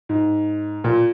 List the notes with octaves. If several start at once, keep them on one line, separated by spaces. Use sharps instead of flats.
G#2
A#2